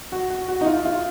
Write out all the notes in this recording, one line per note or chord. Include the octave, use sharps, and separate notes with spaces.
F#4
F#4
F#4
D#4
F4
F4